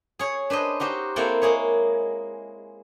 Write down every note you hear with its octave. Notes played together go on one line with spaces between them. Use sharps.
G#4 C#5
D4 B4 C5 D#5
D#4 F#4 G4 C5
A#3 C4 E4 A4 F#5 G5
G#3 A#3 G#4 C#5